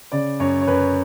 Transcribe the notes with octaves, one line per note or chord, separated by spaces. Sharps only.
C#3 D5
F#2 C#5
C#5
F#2 B4